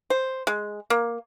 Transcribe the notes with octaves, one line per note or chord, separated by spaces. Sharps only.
C5
G#3
A#3